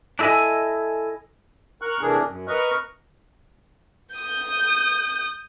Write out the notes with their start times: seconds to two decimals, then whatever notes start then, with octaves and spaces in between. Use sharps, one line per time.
0.19 D4 E4 A4 D#5 G#5
1.82 A#4 C#6 F6 F#6
2.01 C3 E3 A3 D4 G#4 A#4
2.26 F#2
2.47 A#4 B4 D#5 C#6 F6
4.15 D#6 G6